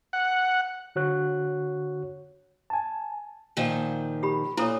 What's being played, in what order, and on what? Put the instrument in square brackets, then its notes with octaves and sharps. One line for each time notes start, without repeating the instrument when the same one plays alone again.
[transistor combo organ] F#5
[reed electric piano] D3 F#4 C#5 F#6
G#5 A5
[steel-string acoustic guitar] A#2 D#3 F3
[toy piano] G4 B5
[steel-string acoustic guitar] A#2 [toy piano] E4 A4 C#5